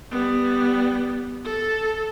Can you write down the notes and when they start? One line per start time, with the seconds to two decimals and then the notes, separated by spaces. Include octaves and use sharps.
0.11 G3 B3
1.45 A4